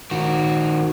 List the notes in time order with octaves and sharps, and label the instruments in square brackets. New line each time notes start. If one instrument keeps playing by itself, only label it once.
[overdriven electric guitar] D#3 F#4